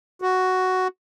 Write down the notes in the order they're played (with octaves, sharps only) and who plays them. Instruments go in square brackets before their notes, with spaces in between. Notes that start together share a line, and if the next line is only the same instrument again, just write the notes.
[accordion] F#4